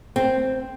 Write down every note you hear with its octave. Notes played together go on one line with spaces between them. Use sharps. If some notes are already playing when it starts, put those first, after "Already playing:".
C4